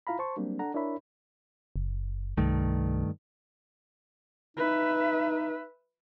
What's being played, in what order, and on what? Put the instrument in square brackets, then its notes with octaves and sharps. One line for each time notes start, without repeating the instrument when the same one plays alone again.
[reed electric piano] E4 F4 F5 A#5 B5
C5 A5 C6 C#6
F#3 G3 A#3 C4 D4
D4 A4 F#5 A#5
D4 E4 A#4 C#5 E5 B5
[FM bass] F#1
[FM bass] C2 [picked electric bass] G2 D#3 A3
[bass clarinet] D#4 [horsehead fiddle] B4 E5